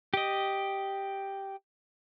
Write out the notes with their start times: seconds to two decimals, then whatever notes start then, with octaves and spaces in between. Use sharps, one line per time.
0.14 G4 D#5